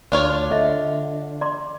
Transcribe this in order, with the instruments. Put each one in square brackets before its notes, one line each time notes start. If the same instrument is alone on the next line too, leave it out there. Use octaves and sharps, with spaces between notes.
[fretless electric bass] D2 [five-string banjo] D4 F4 C#5
[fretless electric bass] D3 [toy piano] D#5 E5
[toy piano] D5 C6 D6